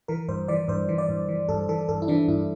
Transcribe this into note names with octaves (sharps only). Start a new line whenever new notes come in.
E3 A#4
G2 C5
E3 D5
G2 C5
E3
D5
G2
E3
G2 A4
E3 A4
G2 A4
E4
E3 D4
G2 E4